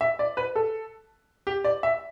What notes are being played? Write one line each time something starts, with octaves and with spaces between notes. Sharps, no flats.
E5
D5
B4
A4
G4
D5
E5